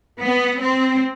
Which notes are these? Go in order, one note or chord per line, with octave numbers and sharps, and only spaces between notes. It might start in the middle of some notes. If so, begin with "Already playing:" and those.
B3
C4